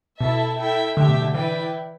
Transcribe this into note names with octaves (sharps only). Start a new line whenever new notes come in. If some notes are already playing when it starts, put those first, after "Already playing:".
B2 E4 A4 E5 A5
E4 A4 E5 G5
D3 A3 G4 E5 G5
B2
D3
E3 E4 B4 D5 G5